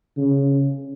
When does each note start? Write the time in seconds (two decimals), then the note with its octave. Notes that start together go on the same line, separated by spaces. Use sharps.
0.17 C#3